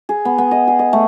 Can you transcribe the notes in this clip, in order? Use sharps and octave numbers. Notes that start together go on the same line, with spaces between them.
G#4
B3
B3
D#5
G#4
D#5
A3